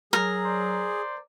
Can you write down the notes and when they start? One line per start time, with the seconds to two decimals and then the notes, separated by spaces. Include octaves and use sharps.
0.13 F#3 G#4 A#4
0.44 C5 D5